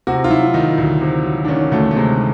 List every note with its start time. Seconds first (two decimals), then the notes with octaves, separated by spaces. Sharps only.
0.07 C3 F#4
0.24 F4
0.30 F#3 E4
0.54 D#3 D#4
0.78 D2
1.01 C3
1.25 F#3
1.44 D4
1.48 D#3 C#4
1.71 D2 A3
1.91 A3
1.96 C3 G#3